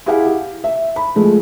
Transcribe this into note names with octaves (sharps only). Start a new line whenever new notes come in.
E4 G4 G#4 F5 F#5
G4
E5
B5
F3 G#3 A3